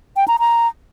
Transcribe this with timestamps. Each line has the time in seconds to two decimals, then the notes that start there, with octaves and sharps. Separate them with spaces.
0.16 G5
0.28 A#5
0.39 A#5